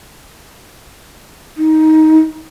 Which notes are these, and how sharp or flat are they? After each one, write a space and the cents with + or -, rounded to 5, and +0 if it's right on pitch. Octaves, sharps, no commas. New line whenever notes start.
D#4 +10